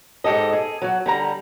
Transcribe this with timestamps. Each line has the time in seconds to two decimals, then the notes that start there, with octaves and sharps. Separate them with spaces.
0.24 G#2 G4 A4 D#5
0.53 G#4
0.82 F#3 F#4
1.06 D3 G3 A#5